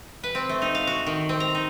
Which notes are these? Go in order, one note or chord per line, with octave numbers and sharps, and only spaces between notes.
B4
C4
A3
D#4
F5
F#4
D#3
C4
A#5
D#4